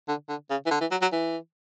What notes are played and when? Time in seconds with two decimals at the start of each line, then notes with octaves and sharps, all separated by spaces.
0.08 D3
0.29 D3
0.50 C#3
0.66 E3
0.71 D3
0.81 E3
0.91 F#3
1.02 F#3
1.12 E3